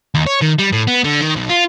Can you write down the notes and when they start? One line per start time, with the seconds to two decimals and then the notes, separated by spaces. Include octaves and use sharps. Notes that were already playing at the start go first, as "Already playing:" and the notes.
0.15 D#2
0.26 C#5
0.41 D#3
0.58 G3
0.72 A2
0.87 B3
1.05 D3
1.21 D#3
1.36 B1
1.49 F4